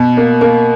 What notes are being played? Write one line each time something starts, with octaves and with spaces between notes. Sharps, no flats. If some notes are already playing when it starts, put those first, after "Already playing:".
Already playing: B2
A#3
A#3